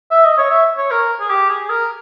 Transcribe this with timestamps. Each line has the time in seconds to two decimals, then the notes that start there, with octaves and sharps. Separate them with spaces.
0.11 E5
0.25 D#5
0.38 C#5
0.51 E5
0.78 C#5
0.91 A#4
1.21 G#4
1.31 G4
1.50 G#4
1.70 A#4